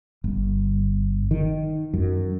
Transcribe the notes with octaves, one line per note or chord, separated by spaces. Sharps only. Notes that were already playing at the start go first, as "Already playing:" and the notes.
G1
D#3
F#2